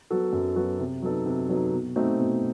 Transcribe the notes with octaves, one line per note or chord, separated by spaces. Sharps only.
F#3 B3 F#4 A4
F#2
F#3 B3 F#4 A4
C3
F#3 B3 D#4 A4
C3
F#3 B3 D#4 A4
B2
A3 C4 D#4 F#4
B2